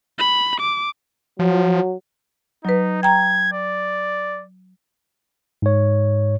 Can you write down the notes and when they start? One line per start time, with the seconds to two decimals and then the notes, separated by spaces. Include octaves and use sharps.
0.19 B5
0.61 D6
1.39 F3 F#3
2.65 F#3 D#4 B4
3.03 G5 A#5 G#6
3.53 D5
5.62 G#2 C#5